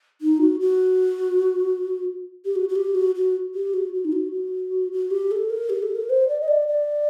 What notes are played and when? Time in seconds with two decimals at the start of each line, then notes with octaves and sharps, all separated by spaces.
0.21 D#4
0.41 F#4
0.60 F#4
2.45 G4
2.55 F#4
2.69 F#4
2.75 G4
2.95 F#4
3.15 F#4
3.54 G4
3.73 F#4
3.93 F#4
4.04 D#4
4.12 F#4
4.32 F#4
4.92 F#4
5.11 G4
5.31 A4
5.50 A#4
5.69 G4
5.82 A4
5.95 A#4
6.09 C5
6.28 D5
6.41 D#5
6.48 D5
6.68 D5